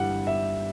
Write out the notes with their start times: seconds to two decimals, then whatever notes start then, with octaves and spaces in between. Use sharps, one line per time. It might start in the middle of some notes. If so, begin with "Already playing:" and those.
Already playing: G1 G2 E3 G3 F#5
0.27 E5